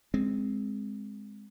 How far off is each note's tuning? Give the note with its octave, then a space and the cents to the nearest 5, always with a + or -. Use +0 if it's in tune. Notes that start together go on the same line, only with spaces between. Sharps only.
G#3 +0 C4 +0